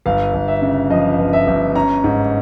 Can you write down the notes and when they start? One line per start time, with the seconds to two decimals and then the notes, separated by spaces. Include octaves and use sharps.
0.06 G1 F5
0.34 G1
0.48 E5
0.62 C#3
0.90 F3 D#5
1.19 G1
1.33 E5
1.47 G1
1.75 C#4 A#5
2.04 G#2